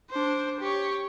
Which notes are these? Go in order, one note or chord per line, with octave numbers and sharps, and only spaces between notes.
D4 C5
G4 C#5